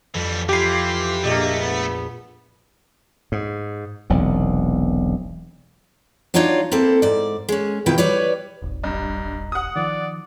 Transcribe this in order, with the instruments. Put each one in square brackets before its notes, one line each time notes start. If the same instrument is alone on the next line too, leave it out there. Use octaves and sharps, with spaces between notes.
[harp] F2 [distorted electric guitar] E3 G3
[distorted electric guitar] E3 [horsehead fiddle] F4 [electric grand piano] G4 C7
[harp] A#1 [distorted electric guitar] A3 [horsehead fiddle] A#3 D#5
[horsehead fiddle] B3
[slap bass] G#2
E1 B1 C3
[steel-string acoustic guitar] F#3 D4 D#4 F4 C#5 D5
A#3 C4 E4 A4
G#2 D5
G#3 C#4
B2 D#3 E4 F4 G5
G3 B4 C#5 D5
[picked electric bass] D#1 G#1
[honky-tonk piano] G2 [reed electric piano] D#5 A#5
[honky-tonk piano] F#5 D#6
[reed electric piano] D#3 F3 [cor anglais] D5